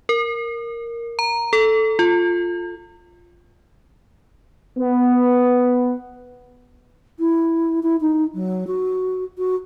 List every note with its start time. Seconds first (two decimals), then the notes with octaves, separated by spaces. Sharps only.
0.09 A#4
1.19 A#5
1.53 A4
1.99 F4
4.78 B3
7.19 E4
7.83 E4
8.01 D#4
8.34 F#3
8.67 F#4
9.38 F#4